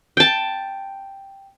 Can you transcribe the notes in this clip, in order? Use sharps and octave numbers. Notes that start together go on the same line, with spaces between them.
G5 A5